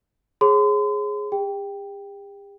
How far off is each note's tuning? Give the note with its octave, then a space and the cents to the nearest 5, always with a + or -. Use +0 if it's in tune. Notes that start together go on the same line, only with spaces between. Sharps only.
G#4 +0 C#5 -35 C6 -40
G4 +45 G5 +5